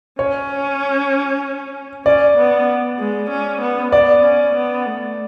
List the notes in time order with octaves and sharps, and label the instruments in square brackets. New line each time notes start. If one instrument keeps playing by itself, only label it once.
[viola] C#4 [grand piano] C#5
[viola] C#4 [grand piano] D5
[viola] B3
G#3
C#4
B3
[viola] B3 [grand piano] D5
[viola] C#4
B3
A3